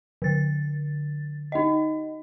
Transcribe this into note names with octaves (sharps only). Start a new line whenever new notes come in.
D3 A6
D#4 D#5